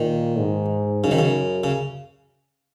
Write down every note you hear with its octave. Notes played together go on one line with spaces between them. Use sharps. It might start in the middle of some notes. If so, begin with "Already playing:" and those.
Already playing: A#2 D#3
G#2
F#2 C#3
D#3
C#3
C#3